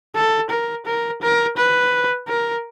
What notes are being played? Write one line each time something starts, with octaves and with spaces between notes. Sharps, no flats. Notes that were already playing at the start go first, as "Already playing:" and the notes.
A4
A#4
A#4
A#4
B4
A#4